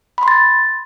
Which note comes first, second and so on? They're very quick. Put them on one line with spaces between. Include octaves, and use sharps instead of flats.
B5 C6 A6